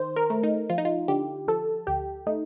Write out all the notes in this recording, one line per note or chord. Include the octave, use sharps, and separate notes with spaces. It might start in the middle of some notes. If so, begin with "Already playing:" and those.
Already playing: D#3 C5
A#4
A3
D#4
F3 F4
D#4
F4
D3 G4
F3 A4
D2 G4
A3 D#4